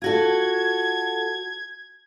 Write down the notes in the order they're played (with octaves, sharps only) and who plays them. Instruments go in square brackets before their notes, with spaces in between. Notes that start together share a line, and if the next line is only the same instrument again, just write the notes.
[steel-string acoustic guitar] F4 F#4 A4 [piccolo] G#6